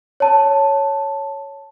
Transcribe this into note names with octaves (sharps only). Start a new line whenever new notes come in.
C#5 A5